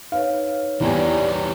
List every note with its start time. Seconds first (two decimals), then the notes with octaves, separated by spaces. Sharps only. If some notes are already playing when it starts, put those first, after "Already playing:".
0.12 D#4 B4 C#5 F5
0.81 E2 E3 G3 A#3 G#5